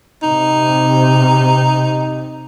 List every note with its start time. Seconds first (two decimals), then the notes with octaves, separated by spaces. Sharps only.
0.22 C3 D#4